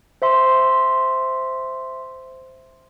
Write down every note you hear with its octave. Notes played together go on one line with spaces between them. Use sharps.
C5 E5 C6